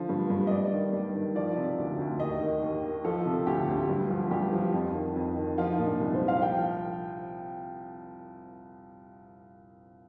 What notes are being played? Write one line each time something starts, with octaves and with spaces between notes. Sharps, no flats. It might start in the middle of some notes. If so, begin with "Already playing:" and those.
Already playing: D3 F3
G2
G2
D#5
G2 D5
D#3
G2
D#3
F3 D5
C3
D2
D2
D#2 D#5
D#3
D#2
D#3
F3 A4
C3
D2 G4
D2
G2
F3
G2 G4
F3
F2
D#3
F2
D#3
F3 F4
D#4
A#2
D4
C2
C5
C2
F5
F3 G5